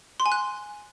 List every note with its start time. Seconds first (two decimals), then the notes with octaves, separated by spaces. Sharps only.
0.20 C6
0.26 G#5
0.32 F#6